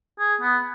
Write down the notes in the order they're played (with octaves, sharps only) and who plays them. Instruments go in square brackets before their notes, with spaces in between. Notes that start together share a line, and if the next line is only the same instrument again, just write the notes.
[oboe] G#4
B3